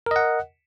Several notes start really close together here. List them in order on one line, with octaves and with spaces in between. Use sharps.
A#4 D#5 F#5